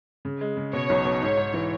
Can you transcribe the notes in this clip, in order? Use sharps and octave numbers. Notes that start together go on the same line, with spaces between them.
C#3
G#3
C#3
B2 C#5
B1
B2
G#2
G#2
E3